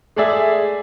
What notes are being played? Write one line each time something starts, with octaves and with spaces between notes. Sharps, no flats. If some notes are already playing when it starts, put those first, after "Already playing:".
G#3 A3 G#4 D5 E5